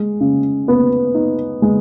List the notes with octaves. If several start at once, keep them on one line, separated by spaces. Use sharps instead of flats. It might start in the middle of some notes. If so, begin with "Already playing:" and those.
Already playing: G#3
C#3
B3
D#4
G#3